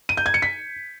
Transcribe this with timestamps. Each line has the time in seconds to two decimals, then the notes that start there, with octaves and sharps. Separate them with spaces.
0.09 D#7
0.17 G6
0.26 G#6
0.34 C#7
0.42 B6